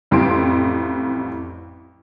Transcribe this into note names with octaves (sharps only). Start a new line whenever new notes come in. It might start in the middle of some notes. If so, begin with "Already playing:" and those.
A1 F2 G3 E4 C6 D7